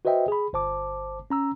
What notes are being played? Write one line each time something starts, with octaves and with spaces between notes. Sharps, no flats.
F#4 B4 C5 D#5 E5 G5
G#4 B5
G1 C5 A5 D6
C#4 A#5 E6